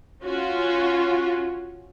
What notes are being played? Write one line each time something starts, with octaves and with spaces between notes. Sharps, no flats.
C#4 F4 F#4